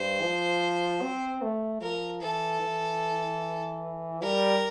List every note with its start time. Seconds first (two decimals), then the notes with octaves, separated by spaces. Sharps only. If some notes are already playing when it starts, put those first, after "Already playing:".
Already playing: G2 C5
0.22 F3
1.02 C4
1.42 A3
1.81 F3 A#4
2.22 E3 A4
2.62 E3
4.22 G3 A#4